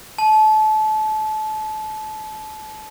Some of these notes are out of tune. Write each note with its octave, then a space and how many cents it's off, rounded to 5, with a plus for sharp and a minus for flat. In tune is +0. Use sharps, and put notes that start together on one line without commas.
A5 -30